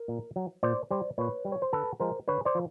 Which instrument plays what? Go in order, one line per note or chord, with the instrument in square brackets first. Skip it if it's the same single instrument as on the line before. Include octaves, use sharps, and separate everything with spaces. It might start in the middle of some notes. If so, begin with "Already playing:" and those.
Already playing: [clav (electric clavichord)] A#4
A#2
F#3
A#2 C5 D5
G3 C5 D5
A#2 B4 C#5
G3
C#5
C5
D3 A4 B4
F3 G#3 A#4 C5
D3 B4 C#5
C5 D5
F3